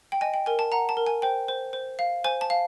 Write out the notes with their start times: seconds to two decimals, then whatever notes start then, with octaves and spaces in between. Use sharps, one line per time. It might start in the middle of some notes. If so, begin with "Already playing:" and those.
0.12 G5
0.21 D#5 G#5
0.34 G5
0.46 A#4 G#5
0.59 A5
0.72 F#5 A#5
0.89 A5
0.97 A#4
1.06 G#5
1.22 C5 G5
1.48 C5
1.73 C5
1.99 F5
2.24 C5 G#5
2.41 A5
2.50 F5